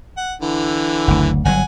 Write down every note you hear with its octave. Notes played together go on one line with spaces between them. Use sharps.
F#5
D3 E3
F#1 D2
G1 F#3 F#5 G#5